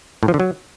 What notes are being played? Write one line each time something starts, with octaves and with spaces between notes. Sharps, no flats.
A2
F3
D3
F#3